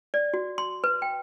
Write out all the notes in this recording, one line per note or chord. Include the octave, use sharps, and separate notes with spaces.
D5
F#4
C6
B4
G5